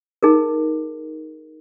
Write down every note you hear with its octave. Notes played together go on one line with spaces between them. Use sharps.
D#4 G#4 A#4